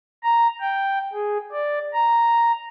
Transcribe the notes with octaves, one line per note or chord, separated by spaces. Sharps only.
A#5
G5
G#4
D5
A#5